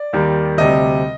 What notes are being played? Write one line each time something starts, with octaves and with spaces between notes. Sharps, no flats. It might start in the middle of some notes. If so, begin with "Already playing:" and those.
Already playing: D5
D#2 D#3 G3
D2 C3 G3 D#5